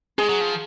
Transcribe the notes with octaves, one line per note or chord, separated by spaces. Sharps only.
G#3 G#4
F#3
F3